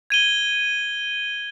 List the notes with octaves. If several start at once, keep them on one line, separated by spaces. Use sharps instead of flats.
G#6 D#7 G7